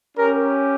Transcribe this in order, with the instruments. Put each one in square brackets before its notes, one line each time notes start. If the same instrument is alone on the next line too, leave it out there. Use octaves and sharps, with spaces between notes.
[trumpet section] C#4 G4 A#4